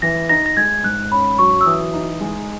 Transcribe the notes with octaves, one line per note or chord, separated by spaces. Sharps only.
E3 A#6
D#4 A#6
A#6
G#3 G#6
G#2 F#6
C#4 B5
F#3 C#6
E6
E3 D#6
D#4
G#3